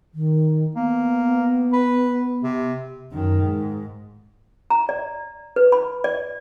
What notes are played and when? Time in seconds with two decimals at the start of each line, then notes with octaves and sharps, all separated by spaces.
0.14 D#3
0.75 A#3 B3
1.73 B4
2.43 C3
3.12 F#2 D#3
3.43 G#2
4.70 A#5
4.89 D5
5.56 B4
5.72 B5
6.04 D5